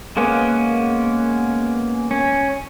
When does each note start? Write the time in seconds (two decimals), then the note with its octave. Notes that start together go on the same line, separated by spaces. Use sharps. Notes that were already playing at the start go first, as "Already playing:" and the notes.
0.17 G#3 A#3 B3 C#4
2.11 C#4